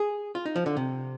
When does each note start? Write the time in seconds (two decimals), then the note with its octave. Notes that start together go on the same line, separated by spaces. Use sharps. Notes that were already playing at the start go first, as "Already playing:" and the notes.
Already playing: G#4
0.35 F4
0.46 D#4
0.56 F3
0.66 D3
0.77 C3